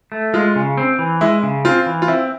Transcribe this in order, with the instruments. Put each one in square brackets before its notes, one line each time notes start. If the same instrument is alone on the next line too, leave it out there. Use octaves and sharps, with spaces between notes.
[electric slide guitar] A3
[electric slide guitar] G#3 [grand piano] F4
[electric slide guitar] C#3
C4
E3
[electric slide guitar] G#3 [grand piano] E4
[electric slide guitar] C#3
[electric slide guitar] C4 [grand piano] F4
[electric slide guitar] E3
[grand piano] F4
[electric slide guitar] C4 [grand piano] E4